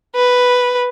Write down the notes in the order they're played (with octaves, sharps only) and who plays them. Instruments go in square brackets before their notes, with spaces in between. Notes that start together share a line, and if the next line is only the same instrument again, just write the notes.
[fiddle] B4